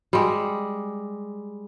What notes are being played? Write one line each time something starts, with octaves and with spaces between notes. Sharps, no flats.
G3 G#3